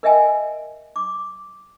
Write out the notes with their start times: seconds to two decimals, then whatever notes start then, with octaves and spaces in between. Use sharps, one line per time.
0.03 A#4 D#5 E5 G5 G#5
0.96 D6